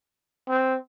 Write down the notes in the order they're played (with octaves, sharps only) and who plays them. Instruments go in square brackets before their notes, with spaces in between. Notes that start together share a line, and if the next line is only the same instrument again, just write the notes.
[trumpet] C4